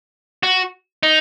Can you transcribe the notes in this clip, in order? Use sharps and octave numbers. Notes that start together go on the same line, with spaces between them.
F#4
D#4